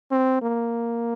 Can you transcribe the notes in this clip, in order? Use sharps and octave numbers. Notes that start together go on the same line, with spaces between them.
C4
A#3